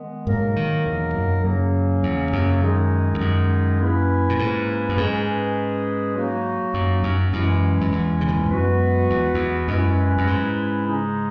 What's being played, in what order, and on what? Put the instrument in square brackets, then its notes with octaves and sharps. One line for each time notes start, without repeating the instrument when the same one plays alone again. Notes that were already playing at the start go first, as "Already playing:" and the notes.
Already playing: [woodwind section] D#3 G#3 B3
[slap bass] G#2 [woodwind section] B2 F#3 A#3 D#4 A#4
[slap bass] D#3
E2
F#2
[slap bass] F#2 [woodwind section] C#3 F#3 A#3 C#4
[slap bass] E2
F#2
[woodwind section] D#3 G#3 D#4 G#4
[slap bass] E2
F#2
[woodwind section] A#3 C#4 E4 B4
[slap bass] A#2
G#2
F#2
[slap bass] G#2 [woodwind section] G#3 C#4 G#4 B4
[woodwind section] F#3 A#3 D#4 F#4
[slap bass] F#2
F#2
[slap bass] F#2 [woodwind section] E3 G#3 C#4 E4
[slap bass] F#2
E2
C#3
B2
A#2
G#2
[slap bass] F#2 [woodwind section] G#3 B3 F#4 B4
[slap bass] E2
E2
[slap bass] F#2 [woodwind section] G#3 C#4 E4 B4
[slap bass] F#2
G#2
[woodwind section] C#3 G#3 D#4 G#4